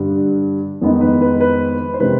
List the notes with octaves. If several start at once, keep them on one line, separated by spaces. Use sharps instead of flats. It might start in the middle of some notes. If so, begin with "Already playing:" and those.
Already playing: G2 D3 G3 D4
F2 D#3 G#3 B3 D#4
B4
B4
B4
C5
C3 D#3 G#3 C4 B4